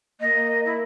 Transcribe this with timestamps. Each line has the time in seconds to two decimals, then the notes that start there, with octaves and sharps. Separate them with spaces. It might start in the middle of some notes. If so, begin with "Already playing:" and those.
0.20 A#3 D#5
0.65 E4